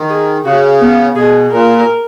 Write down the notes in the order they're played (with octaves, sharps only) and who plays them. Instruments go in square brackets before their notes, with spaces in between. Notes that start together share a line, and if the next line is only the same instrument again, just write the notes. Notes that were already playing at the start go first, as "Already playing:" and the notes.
Already playing: [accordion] D#3
[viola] G#4
[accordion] C#3 [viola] F#4
[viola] B3
[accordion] B2 [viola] G#4
[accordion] A#2 [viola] A#4